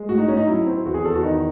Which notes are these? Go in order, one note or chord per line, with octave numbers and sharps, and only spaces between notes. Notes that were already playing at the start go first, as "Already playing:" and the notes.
Already playing: G#3
A2 F#4
D#4
A2 C#4
D#4
F#3 E4
C4
E2 F#4
G#4
E2 A4
F#4
D#3 D#4